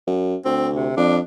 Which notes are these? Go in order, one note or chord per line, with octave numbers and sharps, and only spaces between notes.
F#2
D2 C4
C3
F2 D4